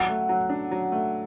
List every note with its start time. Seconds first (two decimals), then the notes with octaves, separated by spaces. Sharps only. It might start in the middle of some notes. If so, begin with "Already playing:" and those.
Already playing: F#3 F#5
0.08 A3
0.29 F#3
0.49 D4
0.71 F#3
0.92 A3